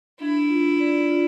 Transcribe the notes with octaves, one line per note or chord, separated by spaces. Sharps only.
D4 E4
F4
D5
F4